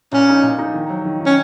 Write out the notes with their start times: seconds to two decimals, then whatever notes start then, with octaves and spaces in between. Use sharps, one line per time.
0.12 A#2 C#4
0.29 D#4
0.44 A#2
0.59 D#4
0.74 D#3
0.90 F#3
1.05 D#3
1.21 D#3
1.26 C#4